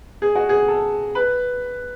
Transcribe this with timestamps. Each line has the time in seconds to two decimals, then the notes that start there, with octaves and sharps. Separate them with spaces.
0.22 G#4
0.35 F#4
0.49 G#4
0.68 A4
1.15 B4